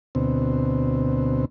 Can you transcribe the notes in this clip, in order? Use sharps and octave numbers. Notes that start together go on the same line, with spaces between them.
D2 B2 C4